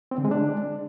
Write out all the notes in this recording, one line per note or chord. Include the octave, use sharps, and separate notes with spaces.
C4
D3
G#3
D4